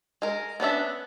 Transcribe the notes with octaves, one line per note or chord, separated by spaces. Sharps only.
G#3 A#4
B3 C#4 D4 E5